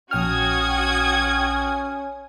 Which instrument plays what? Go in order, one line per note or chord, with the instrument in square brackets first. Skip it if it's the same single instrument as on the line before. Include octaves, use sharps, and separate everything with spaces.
[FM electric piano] A#1 G5 F6 [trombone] C#4 [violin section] F#4 D#6 G#6